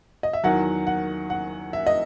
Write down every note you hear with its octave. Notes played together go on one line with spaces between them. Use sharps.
D#5
E5
E2 D#3 F#3 F#5
F#5
F#5
E5
D#5